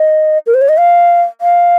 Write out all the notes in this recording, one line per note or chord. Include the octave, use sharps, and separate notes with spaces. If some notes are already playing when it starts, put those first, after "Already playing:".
Already playing: D#5
A#4
C5
C#5
D#5
F5
F5